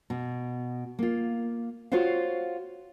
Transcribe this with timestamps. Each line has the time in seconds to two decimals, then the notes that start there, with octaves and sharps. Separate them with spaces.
0.10 B2
0.99 A#3 F4
1.92 F4 F#4 C5 C#5 F5